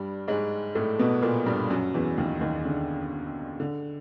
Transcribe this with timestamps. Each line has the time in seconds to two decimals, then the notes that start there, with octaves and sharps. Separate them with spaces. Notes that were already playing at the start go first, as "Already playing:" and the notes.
Already playing: G2 G3
0.28 G#2 G#3
0.75 A2 A3
0.99 B2 B3
1.22 A#2 A#3
1.46 G2 G3
1.70 F#2 F#3
1.94 E2 E3
2.18 D#2 D#3
2.41 D#2 D#3
2.65 D3
3.60 D3